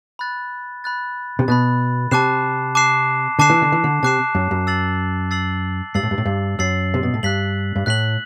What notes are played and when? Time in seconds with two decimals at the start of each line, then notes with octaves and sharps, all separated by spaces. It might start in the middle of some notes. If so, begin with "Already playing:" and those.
0.19 B5 F#6 A6
0.84 B5 F#6 A6
1.39 C3
1.48 B2 B5 F#6 A6
2.11 C3 A5 D6 F#6 C7 E7
2.75 A5 D6 F#6 C7 E7
3.39 D3 A5 D6 F#6 C7 E7
3.50 E3
3.62 D3
3.72 E3
3.84 D3
4.03 C3 A5 D6 F#6 C7 E7
4.35 F#2
4.51 F#2
4.67 E6 A6 C7 F#7
5.31 E6 A6 C7 F#7
5.94 G2 E6 A6 C7 F#7
6.03 A2
6.11 G2
6.18 A2
6.25 G2
6.59 F#2 E6 A6 C7 F#7
6.94 C3
7.03 B2
7.14 A2
7.23 G2 F#6 B6 F#7
7.76 G2
7.86 A2 F#6 B6 F#7